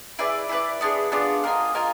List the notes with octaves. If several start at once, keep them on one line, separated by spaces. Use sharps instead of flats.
E4 G#4 B4 D5
E4 G#4 B4 D5
B3 D4 F4 G#4
B3 D4 F4 G#4
F4 A#4 D#5 G#5
F4 A#4 D#5 G#5